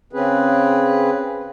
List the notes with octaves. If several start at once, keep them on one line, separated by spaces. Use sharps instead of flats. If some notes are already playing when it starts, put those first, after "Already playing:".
C#3 C4 C#4 G#4 B4